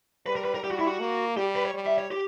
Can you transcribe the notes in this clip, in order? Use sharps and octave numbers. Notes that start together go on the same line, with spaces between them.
G3 B4
A#4
B4
A#4
G3 G4
F#4
E4
F#4
A#3
G3 G4
B4
C#5
G3
E5
C#5
G4